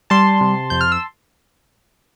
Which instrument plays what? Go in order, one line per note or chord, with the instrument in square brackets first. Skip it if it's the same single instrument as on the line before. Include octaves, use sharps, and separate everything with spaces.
[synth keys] G3 A5 C6
C3
F2 G6
F6
E6